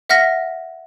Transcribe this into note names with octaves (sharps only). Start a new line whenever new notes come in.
E5 F#5 F6 A#6 B6